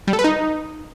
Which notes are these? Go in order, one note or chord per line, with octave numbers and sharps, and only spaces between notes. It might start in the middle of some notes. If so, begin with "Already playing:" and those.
G3
A4
B4
D#4